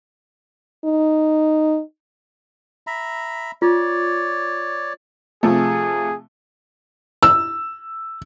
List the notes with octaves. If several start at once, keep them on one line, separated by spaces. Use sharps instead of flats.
D#4
E5 A#5 B5
F4 C#5 D5
C3 F3 A3 G#4
E6